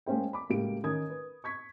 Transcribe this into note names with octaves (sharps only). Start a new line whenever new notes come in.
G#3 A#3 C#4 C5 G5
B5 D6
C#2 A2 A#3 F#4 G4 D7
D#3 C#4 A#4 D#6 G#6
B4
C#6 G#6 B6